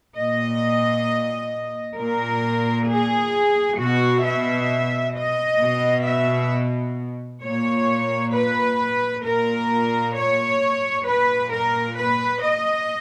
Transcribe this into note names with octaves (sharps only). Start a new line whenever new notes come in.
A#2 D#5
A#2 A#4
G#4
B2 F#4
E5
D#5
B2
E5
A#2 C#5
B4
A#2 A#4
C#5
A#2 B4
A#4
B4
D#5